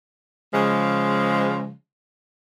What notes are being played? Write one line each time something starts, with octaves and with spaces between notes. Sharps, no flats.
C#3 F3 G#3